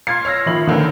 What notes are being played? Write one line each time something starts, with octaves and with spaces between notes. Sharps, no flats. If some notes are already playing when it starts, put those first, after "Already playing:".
C6 F6 G#6 A6 C7
C#5 E6 F6 A#6
D#3 F3 C#5 E5 B5 F#7
D3 D#3 A4 B4